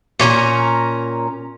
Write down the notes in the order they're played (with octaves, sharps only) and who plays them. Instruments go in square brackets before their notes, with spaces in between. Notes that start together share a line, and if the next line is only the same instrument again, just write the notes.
[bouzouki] A#2 C#4 F#4 A#4